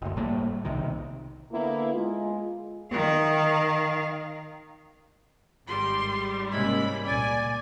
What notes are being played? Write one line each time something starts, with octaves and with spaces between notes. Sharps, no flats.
F#1 D2
A2 G3 A3 A#3
B1 C3 D#3
D3 A#3 B3 E4
G#3 F4
D#3 F5
G#1 G#2 G3 C6
C3 G#3 A#3 C#4 E4 B5
C#2 A#2 D5 G#5